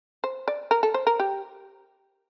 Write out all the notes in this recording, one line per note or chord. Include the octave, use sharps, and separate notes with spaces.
C5
D5
A#4
A4
C5
A#4
G4